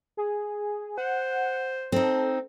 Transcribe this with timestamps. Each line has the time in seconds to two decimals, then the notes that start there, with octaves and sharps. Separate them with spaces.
0.17 G#4
0.98 C5 F#5
1.92 C4 D#4 A4